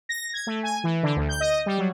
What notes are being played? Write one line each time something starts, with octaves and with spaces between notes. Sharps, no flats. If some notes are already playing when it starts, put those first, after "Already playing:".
A#6
G#6
A3
G#5
E3
D3
D2
G6
D#5
G3
F#3